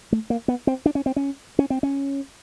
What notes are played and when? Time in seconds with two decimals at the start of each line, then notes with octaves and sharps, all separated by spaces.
0.12 A3
0.30 A#3
0.48 B3
0.67 C4
0.86 D4
0.95 C#4
1.06 C4
1.16 C#4
1.59 C#4
1.70 C4
1.83 C#4